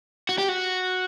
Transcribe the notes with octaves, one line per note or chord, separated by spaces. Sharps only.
F#4
G4
F#4